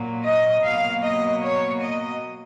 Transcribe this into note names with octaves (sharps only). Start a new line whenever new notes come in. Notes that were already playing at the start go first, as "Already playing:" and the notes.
Already playing: A#2 F#3 A#3
D#5
B2 F#3 A#3 F5
D#5
C#5
D#5